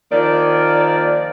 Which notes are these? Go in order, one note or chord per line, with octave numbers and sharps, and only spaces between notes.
D#3 F3 A#3 D5